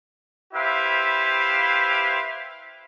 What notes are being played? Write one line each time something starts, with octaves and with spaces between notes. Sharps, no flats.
E4 G4 B4 C5 E5 F5